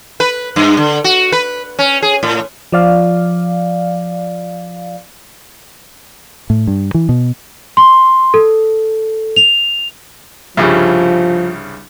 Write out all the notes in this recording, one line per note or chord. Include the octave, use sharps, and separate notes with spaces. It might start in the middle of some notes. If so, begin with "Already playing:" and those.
B4
G2
D3
F#4
B4
C#4
G#4
A2
F3 D5 F5
A2
G2
E3
B2
C6
A4
F7
C2 G2 C#3 F3